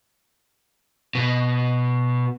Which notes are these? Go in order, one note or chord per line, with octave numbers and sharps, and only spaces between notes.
B2